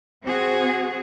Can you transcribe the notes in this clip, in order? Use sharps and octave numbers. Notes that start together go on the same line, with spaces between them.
C4 F#4 G#4